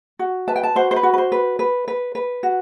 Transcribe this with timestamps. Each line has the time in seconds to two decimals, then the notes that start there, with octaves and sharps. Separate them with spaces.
0.19 F#4
0.48 B4 A5
0.56 G5
0.63 A5
0.76 F#4 C5
0.91 C5
0.96 B4
1.03 F#4
1.13 B4
1.18 C5
1.32 B4
1.59 B4
1.88 B4
2.15 B4
2.43 F#4